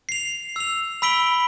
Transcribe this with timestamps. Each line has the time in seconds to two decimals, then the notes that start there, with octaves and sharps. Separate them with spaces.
0.09 C7 F7
0.56 E6 F7
1.02 B5 E6 B6 D7 F#7 G7